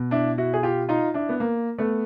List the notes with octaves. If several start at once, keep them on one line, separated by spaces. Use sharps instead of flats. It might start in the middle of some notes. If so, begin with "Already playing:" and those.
Already playing: B2
D4 E4
E4 F#4
G#4
F4 G4
D#4 F4
D4 E4
B3
A#3
A3 B3